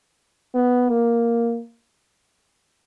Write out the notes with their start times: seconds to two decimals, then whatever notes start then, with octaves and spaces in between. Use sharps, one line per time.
0.54 B3
0.89 A#3